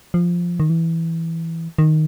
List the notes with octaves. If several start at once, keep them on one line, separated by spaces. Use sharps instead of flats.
F3
D#3
E3
D#3